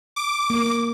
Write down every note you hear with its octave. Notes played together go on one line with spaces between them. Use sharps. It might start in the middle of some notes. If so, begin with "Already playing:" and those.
D6
A#3